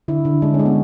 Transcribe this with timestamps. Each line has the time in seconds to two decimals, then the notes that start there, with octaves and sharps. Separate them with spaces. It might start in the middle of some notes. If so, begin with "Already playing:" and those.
0.08 D3 E4
0.25 D3
0.42 G#3 D4
0.54 C#4
0.59 G#3
0.65 B3